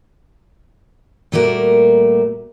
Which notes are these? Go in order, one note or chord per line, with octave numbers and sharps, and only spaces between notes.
A#2 G3 A3 A#3 F#4 A#4